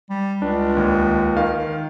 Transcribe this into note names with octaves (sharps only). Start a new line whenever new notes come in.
G3
C#2 D4
D#2
D#3 F5